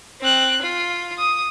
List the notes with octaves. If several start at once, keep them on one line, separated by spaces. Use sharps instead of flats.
C4 F#6
F4
D#6